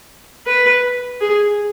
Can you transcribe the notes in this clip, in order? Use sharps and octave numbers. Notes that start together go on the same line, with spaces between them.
B4
G#4